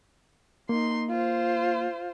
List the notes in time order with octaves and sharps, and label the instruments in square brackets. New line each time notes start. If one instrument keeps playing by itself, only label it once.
[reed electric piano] A#3 [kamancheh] D#4 C6
[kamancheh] F4 C5